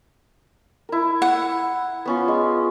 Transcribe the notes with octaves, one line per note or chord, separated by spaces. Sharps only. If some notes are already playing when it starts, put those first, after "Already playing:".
E4 A#4
F#5
B3 C#4 F4
G#3